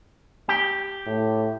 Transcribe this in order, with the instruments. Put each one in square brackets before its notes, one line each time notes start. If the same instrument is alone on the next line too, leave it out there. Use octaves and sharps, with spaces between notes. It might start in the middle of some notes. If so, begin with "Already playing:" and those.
[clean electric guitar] G4
[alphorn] A2